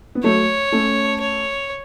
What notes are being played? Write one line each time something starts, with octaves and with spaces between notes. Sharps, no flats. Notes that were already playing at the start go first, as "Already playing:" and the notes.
B3
F#3 A3 C#5
A3 C#4
C#5